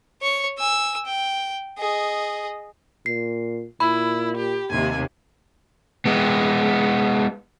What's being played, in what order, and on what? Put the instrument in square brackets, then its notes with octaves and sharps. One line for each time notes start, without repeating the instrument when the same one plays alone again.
[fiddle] C#5 C#6
G#5 E6
G5
G#4 D#5
[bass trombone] A#2 [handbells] C7
[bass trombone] A#2 [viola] E4 [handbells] B5
[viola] G4
[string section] D#2 C3 [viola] G#5
[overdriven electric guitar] G#3 B3